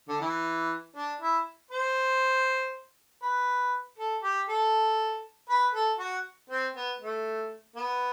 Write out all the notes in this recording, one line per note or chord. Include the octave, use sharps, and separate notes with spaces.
D3
E3
D4
E4
C5
B4
A4
G4
A4
B4
A4
F#4
C4
B3
A3
B3